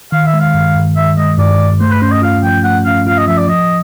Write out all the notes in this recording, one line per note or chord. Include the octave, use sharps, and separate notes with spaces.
D#3 F5
E5
G#3
F5
G2
G2
D#3 E5
G#3 D#5
G2 D5
G2
A3 C5
B4
C#4 C5
D#5
F4 F5
F3 G5
A3 F#5
C#4 F5
F4 F5
D#5
F3 E5
D5
F3 D#5